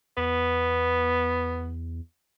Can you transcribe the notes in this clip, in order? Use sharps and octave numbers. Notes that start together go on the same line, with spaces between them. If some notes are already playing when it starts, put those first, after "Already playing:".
E2 B3